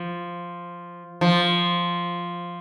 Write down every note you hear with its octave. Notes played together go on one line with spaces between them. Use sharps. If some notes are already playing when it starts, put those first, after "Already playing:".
Already playing: F3
F3